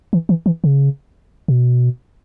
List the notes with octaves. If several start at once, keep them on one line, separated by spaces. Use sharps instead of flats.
E3
E3
E3
C#3
B2